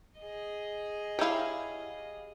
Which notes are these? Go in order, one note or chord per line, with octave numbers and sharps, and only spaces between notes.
G#4 D#5
E4 G4 C#5 F5